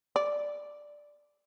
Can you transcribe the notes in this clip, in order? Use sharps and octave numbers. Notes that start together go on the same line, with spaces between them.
D5